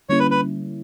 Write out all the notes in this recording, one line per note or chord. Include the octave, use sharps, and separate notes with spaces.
D3 G3 A#3 C#4 E4 C#5
B4
B4